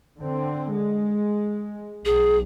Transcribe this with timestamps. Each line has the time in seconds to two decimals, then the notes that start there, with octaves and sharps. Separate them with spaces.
0.20 D3 C4
0.74 G#3
2.05 B1 G#4